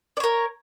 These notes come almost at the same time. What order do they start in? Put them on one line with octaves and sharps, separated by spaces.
D5 C#5 A#4